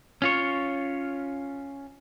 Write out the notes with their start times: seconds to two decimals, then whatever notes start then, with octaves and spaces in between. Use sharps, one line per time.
0.22 C#4 F4 C#5